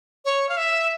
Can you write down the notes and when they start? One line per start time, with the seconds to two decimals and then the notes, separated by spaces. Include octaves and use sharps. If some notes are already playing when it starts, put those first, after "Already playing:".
0.25 C#5
0.49 F5
0.57 E5